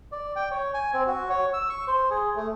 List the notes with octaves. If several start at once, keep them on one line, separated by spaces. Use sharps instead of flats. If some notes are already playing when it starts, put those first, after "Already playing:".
D5
G5
C#5
G#5
C4
F#4
C#5
E6
C#6
C5
G#4
A3